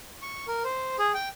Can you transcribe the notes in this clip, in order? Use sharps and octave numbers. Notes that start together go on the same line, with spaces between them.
C#6
A#4
C5
G#4
G5